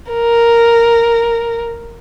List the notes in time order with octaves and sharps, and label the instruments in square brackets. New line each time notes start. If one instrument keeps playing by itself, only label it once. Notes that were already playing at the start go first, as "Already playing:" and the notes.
[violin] A#4